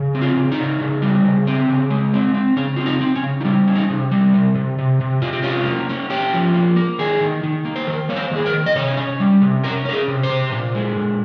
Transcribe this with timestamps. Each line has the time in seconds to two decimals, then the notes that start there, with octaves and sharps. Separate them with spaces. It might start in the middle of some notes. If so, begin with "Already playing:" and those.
Already playing: C#3
0.15 C4
0.21 F4
0.37 C#3
0.52 D#4
0.58 C#3
0.81 C#3
1.02 G3
1.25 C#3
1.47 C4
1.69 C#3
1.90 G#3
2.14 C4
2.34 C4
2.57 C#3 C#4
2.76 C4 F4
2.86 D#4
3.01 C4
3.15 C#4
3.23 C#3
3.40 D#4
3.45 G3 C#4
3.67 C#4
3.75 D#4
3.90 C3
4.11 G3
4.34 C3
4.55 C3
4.78 C3
5.01 C3
5.22 C3 F4
5.33 G4
5.42 C#4 F4
5.66 A#3
5.89 C#4
6.10 C#4 G4
6.33 F3
6.54 A#3
6.76 A#3
6.99 D#3 G#4
7.21 D#3
7.43 D#3
7.65 A#3
7.76 C5
7.87 D#3 A#4
8.09 A#3 C#5
8.16 C5
8.31 D#3 G#4
8.46 A#4
8.53 D#3
8.66 D#5
8.75 C3 C#5
8.97 C#4
9.20 G3
9.42 C3
9.64 C#4 A#4
9.85 C#4 A#4
9.93 G#4
10.08 C3
10.23 C5
10.30 C3
10.52 A#2
10.75 G#3
10.97 A#2